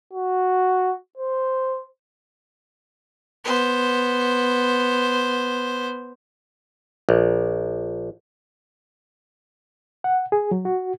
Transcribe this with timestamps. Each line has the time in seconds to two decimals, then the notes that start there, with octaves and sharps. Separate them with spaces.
0.13 F#4
1.18 C5
3.44 B3 C5
7.09 A#1
10.04 F#5
10.32 G#4
10.51 F#3
10.65 F#4